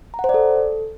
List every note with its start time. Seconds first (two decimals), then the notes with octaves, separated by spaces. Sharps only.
0.14 A#5
0.19 F#5
0.24 C5
0.29 D5
0.34 A4